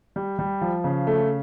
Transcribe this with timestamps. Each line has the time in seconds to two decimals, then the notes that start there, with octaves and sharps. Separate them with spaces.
0.16 G3
0.39 G3
0.61 F3
0.84 C#3
1.07 A3